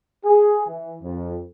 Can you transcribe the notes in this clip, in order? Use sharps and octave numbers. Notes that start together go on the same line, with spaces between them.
G#4
E3
F2